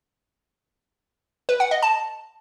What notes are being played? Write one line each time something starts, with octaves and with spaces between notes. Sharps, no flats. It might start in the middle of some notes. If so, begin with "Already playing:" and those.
B4
F#5
D#5
A5